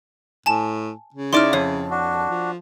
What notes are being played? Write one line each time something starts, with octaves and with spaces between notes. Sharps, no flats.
A2 G#5 A5 E7
C#3
D#4 E4 D5 C6 D6 F6
F2 C#5
D4 F#4
F3